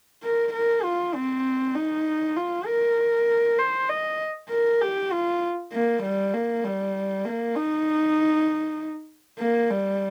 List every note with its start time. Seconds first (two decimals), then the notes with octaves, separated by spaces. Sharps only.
0.23 A#4
0.53 A#4
0.84 F4
1.15 C4
1.75 D#4
2.37 F4
2.66 A#4
3.58 C5
3.89 D#5
4.50 A#4
4.81 G4
5.12 F4
5.72 A#3
6.03 G3
6.34 A#3
6.64 G3
7.25 A#3
7.55 D#4
9.39 A#3
9.70 G3